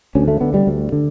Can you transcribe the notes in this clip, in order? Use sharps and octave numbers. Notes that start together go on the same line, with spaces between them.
D2 C#4
A3
D3 B3
G3
D2
D3